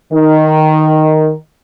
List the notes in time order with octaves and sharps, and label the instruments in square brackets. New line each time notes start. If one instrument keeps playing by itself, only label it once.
[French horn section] D#3